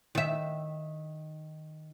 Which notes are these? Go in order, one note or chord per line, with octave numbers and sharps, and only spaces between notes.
D#3 E5